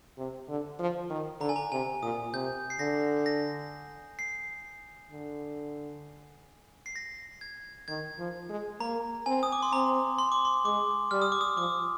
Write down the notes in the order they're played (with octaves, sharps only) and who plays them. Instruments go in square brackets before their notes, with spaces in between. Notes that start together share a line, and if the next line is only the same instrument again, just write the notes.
[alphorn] C3
D3
F3
D#3
[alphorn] D3 [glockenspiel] A#5
[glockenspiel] G#5
A#5
[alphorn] C3 [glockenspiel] G#5
[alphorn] A#2 [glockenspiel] D#6
[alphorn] C3 [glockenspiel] G6
[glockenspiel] C7
[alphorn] D3 [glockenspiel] A#6
[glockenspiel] A#6
C7
[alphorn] D3
[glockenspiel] C7
A#6
G#6
[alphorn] D#3 [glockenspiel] G#6
[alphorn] F3
G#3
[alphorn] A#3 [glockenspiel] A#5
[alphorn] C4 [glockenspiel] G#5
[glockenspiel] D#6
D6
C6
[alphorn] C4 [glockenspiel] A#5
[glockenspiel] C6
D6
C6
[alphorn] G#3 [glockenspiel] D6
[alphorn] G3 [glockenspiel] F6
[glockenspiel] D#6
D6
D#6
[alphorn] F3 [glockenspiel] D6